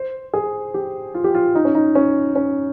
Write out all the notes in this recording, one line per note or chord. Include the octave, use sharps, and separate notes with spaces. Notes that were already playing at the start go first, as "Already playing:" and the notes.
Already playing: C5
G#4
G4
F4
G4
F4
D#4
C#4
D#4
C#4
C#4